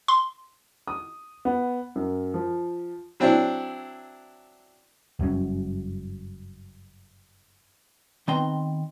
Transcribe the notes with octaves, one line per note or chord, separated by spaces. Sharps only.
C6
D#6
B3
F#2
F3
F#3 C4 D4 E4
F#1 G2 F#3 C#4
D#3 B3 C4 A#5 C6